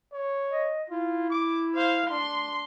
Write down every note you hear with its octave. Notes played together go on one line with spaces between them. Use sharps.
C#5
D#5
E4 F4
D6
C5 F5
D4 C6